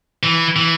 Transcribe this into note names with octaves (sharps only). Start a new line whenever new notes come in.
E3
E3